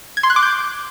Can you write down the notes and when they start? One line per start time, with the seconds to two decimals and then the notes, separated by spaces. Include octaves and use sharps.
0.17 G#6
0.23 C6
0.30 F#6
0.36 D6
0.43 G6